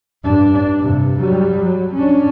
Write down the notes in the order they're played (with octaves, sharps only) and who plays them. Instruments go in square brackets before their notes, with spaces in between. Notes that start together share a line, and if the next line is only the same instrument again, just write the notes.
[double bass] G2 D4
G2 C3
F#3 G3
F#3
C#4 D4